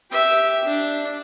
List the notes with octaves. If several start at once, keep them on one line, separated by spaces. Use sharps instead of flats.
G4 E5
D4